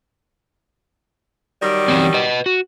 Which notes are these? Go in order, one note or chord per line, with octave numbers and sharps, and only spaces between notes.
D#3 F#3 G3
E3 C4 C#4
B4 D#5
F#4